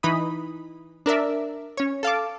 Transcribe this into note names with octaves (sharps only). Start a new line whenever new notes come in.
E3 D#4 B5 D#6
D4 A#4 D5 E5
C#4 C#5
A4 F5 A5 D6